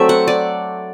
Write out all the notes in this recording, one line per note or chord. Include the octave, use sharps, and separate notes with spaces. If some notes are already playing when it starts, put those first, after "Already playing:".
Already playing: F#3 A3 C4 D5 E5
F#5
D5